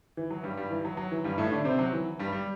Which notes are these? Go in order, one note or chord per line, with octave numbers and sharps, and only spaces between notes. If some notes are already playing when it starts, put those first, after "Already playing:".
E3
F#3
G2 G3
G2 G3
E3
F#3
F#3
E3
G2 G3
A2 A3
D3 D4
C3 C4
F#3
E3
G2 G3
G3